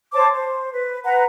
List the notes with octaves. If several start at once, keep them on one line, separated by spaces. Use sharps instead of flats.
C5 C#5 A5 D6
C5
B4
B4 F#5 A#5